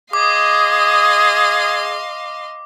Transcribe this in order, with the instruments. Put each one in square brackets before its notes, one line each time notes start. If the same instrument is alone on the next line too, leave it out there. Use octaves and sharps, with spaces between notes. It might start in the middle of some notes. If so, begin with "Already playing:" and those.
[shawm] G#4 [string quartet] D#5 F5 C6 [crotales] D6 [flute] D#6